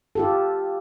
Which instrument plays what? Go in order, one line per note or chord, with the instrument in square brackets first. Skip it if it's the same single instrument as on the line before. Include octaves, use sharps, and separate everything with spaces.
[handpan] F4 G4 A4